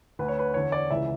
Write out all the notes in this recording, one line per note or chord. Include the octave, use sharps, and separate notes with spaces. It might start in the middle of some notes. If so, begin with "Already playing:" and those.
D2 D3 B4
C#5
B4
E2 D3 C#5
D5
C#2 C#3 E3 E5